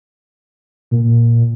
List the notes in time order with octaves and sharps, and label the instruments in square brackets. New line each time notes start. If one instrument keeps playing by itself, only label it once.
[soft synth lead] A#2